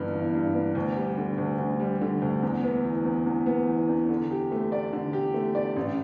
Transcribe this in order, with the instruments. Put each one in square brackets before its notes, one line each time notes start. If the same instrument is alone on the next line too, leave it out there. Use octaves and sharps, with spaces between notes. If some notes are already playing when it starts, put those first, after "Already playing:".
Already playing: [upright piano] G1 G2 E3 B3
E3
G2
B3
D2
G3
D3
D2
D2
G3
D3
D2
E2
B3
E3
E2
E2
B3
E3
E2
D3
G4
A3
D5
D3
G4
A3
D5
A1